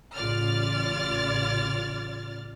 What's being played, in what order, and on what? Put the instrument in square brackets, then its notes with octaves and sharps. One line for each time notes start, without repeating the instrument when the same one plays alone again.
[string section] A1 C#3 F4 D5 F6 A6